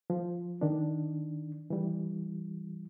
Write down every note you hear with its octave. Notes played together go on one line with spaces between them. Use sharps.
F3
D#3 D4
E3 G3